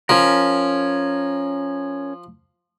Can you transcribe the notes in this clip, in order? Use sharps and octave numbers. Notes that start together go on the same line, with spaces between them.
F3 C#4 A#4